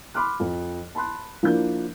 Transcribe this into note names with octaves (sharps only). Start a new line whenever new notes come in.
B5 C6 D6 F6 F#6
F2
A5 B5 C6 F#6
F3 A#3 D4 E4 G6